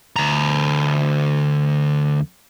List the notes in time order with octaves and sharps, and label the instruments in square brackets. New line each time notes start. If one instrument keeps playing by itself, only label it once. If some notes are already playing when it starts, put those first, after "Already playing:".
[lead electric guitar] D2 A#5